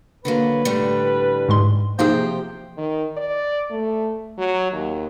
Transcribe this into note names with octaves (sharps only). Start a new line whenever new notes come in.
D3 F#3 A#3 B4
A2 D3 G3
G#2 G#3 C6
C3 F3 A#3 D#4 G4 G#4 C5
D#3
D5
A3
F#3
D#2